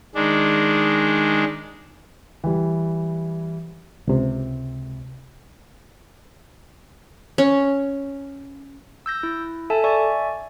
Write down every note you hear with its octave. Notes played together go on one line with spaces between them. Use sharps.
D#3 G#3 D4
E3 G3
C#2 C3
C#4
E6 G6 A#6
E4
A4 E5 G#5 A5
D5 E5 G#5 C#6